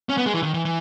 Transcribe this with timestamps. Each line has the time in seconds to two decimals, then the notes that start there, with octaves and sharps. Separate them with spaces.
0.09 C#4
0.17 B3
0.26 G#3
0.34 E3
0.43 D#3
0.54 E3
0.65 E3